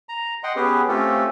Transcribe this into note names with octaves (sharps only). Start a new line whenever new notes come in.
A#5
D#5 F#5 G5 C6
B3 C#4 G4 G#4 B4
A3 C4 C#4 F4 G4 A4